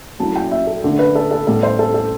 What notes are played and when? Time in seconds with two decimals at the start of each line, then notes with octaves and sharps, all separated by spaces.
0.20 F#3 A3 E4 A5
0.36 G5
0.51 E5
0.67 A4
0.84 D3 A3 D4
0.99 B4
1.15 A4
1.31 A4
1.47 A2 G3 B3 A4
1.63 C5
1.79 A4
1.94 A4